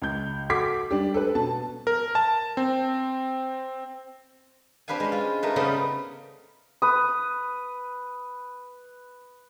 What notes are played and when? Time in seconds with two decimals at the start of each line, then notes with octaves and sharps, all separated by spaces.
0.02 C#2 G6
0.50 F#4 A4 D6 G#6 B6
0.91 G3 D4 G4
1.14 A4 B4
1.35 B2 A5
1.87 A#4
2.15 A5
2.57 C4
4.88 C4 D4 G4 B4 F5 G#5
5.00 G#3 C#4
5.12 F4
5.43 A3 D#4 A#4 B4
5.56 C#3 G3 A3 B3 C4
6.82 B4 D#6